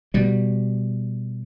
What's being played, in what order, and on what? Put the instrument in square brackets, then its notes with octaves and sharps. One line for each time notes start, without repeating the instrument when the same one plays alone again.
[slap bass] B2 G3